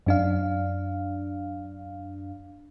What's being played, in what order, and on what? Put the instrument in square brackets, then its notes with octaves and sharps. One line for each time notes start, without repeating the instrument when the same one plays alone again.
[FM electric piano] F#2 D4 F5